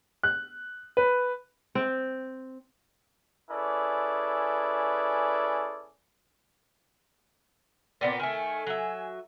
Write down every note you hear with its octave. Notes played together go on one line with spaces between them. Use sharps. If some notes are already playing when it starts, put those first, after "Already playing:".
F#6
B4
C4
C#4 E4 G#4 A4 B4 D5
A#2 B3 C4 D5
D#3 A3 G#5
F#3 E5